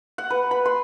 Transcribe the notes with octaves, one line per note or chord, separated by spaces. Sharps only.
F#5
B4
B5
C6